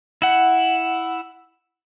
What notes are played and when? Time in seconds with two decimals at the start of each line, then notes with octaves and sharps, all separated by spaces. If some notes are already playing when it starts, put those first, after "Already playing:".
0.22 E4 F#5